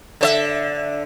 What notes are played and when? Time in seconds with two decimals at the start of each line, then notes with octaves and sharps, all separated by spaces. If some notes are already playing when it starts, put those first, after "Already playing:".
0.21 D3 C5 E5